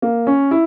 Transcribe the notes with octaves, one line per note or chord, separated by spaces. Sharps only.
A#3
C#4
E4